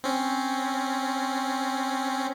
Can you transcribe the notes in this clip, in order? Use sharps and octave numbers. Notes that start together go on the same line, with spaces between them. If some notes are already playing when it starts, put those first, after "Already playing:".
C4 C#4